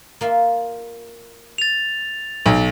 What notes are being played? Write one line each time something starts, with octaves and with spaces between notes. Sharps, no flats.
A#3 F4 E5
A6 F7
B1 G4